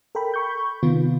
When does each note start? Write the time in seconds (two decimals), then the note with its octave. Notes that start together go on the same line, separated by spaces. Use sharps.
0.15 A4 A#4 G5 B5
0.34 B5 C#6 G6
0.83 C3 D#3 B3 F4